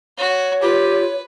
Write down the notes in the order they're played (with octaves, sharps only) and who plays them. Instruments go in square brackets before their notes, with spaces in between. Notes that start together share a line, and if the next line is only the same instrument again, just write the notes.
[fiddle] F#4 [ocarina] C#5
[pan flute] F4 [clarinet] G4 [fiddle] B4